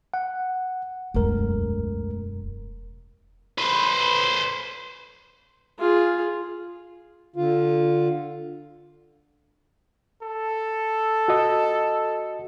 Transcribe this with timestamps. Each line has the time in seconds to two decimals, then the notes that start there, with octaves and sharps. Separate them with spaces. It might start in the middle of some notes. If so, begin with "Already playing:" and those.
0.14 F#5
1.14 E1 C#2 F#2 A3 A#4
3.58 B4 C5
5.79 F4 G#4
7.36 D3 F4
10.23 A4
11.28 F#4 D#5